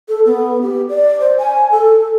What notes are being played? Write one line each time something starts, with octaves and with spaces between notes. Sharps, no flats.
A4
B3
G4
D5
C5
G#5
A4